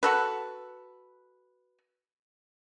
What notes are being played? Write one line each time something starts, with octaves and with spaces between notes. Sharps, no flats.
F#4 A4 B4